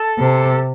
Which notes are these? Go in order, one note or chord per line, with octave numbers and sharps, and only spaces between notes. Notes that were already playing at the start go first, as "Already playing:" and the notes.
Already playing: A4
C3